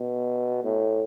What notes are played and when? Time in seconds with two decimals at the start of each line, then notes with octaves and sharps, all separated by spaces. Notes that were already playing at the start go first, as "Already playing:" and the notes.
Already playing: B2
0.64 A2